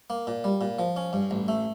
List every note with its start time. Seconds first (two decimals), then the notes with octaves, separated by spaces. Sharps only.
0.10 A#3
0.27 A#2
0.44 G3
0.61 A#2
0.79 F3
0.97 C#4
1.13 G2
1.31 A1
1.48 A3